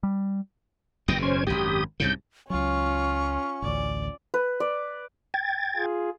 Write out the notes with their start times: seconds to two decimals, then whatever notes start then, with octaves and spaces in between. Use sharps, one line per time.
0.03 G3
1.08 F#1 E2 B2 G5 D#6 A#6
1.22 C#4 C5 G#6
1.47 G#1 F#2 G4 D#6
2.00 C2 G#2 C#3 G6
2.50 C#2 F#3 C#4 F4 C#6
3.62 A1 D2 D5
4.34 B4
4.60 D5
5.34 G5 G#6 A6
5.76 F4 G#4